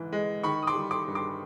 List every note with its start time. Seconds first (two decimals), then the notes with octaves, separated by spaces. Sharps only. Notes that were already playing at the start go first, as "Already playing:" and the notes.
Already playing: G#2 E3
0.12 G#3
0.43 D#3 B5 C#6
0.63 D#6
0.67 C6 D6
0.75 G3
0.91 C6 D6
1.07 G2
1.15 C6 D6